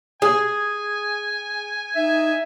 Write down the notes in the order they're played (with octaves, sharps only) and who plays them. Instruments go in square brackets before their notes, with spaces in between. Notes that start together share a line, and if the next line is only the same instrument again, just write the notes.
[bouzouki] G#4 [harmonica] G#5
[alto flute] D#4 [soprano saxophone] E5